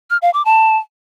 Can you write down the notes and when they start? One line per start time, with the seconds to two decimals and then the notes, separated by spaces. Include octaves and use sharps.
0.10 F6
0.22 F5
0.34 D6
0.45 A5